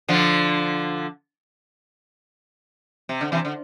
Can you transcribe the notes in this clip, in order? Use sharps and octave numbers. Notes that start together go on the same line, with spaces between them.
D3 F3
C3
D3
C3 E3
D3